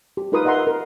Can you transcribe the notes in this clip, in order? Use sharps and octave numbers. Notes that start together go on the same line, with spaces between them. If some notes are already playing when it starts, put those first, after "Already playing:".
G4
D#4 F4 A#4 B4 C6 D#6
D#5 E5 F#5 A#5 C6
A#4